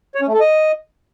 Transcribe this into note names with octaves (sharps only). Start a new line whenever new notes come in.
C#5
C#4
A3
A4
D#5